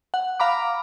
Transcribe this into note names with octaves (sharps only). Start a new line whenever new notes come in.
F#5
F5 A#5 B5 D6